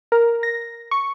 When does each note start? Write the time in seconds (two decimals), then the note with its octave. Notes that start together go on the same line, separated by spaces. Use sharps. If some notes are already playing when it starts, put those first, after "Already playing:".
0.12 A#4
0.43 A#6
0.91 C#6